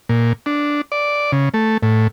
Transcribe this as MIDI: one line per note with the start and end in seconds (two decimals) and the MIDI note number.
0.09 0.33 46
0.46 0.81 62
0.92 1.32 74
1.32 1.49 49
1.54 1.77 57
1.83 2.08 45